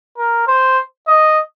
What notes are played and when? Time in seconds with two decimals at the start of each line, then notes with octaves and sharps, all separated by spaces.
0.18 A#4
0.48 C5
1.08 D#5